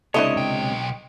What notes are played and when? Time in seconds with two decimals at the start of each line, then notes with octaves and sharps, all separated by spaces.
0.14 C#2 C3 D4 E4 A4 C#5 D#5
0.37 B1 G5